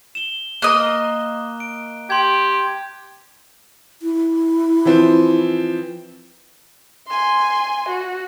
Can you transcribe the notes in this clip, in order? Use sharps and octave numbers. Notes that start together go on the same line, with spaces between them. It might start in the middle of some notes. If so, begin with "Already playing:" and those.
E7 G7
A#3 D#5 A#5 F#6
D7
G4 C6 G#6
E4
E3 F3 C4
G#5 C6
F#4